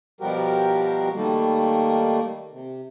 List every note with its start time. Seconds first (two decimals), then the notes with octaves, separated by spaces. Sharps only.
0.21 B2 F3 G3 F#4 G4 A#4
1.14 D#3 G3 A3 A#3
2.51 C3